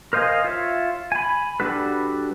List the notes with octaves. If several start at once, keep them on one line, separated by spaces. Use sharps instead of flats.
A#4 C5 D#5 F5 G#5
F4 C#5 E5
G#5 B5
G3 D4 F#4 A4 B4